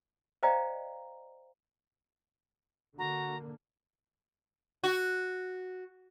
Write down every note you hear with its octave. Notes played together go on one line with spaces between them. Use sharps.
C5 D5 D#5 F5 G5 A#5
D3 A#3 F#4 A#5
F#4